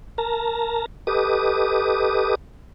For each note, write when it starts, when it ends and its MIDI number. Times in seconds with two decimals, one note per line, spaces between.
0.18 0.86 70
0.18 0.86 81
0.18 0.86 82
1.07 2.35 67
1.07 2.35 69
1.07 2.35 71
1.07 2.35 75
1.07 2.35 86
1.07 2.35 87